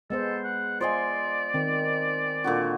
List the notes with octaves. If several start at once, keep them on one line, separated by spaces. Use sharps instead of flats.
G#3 B3 A4 C5
F#5
F4 C5 D5 D#5 G#5
D#3 C4
A#2 D3 F#4